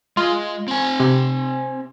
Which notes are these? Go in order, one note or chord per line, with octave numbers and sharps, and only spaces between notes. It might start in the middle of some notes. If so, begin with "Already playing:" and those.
G#3 F4
C4 G#5
C3